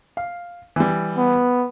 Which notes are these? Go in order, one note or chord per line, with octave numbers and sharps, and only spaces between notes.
F5
E3 G3
B3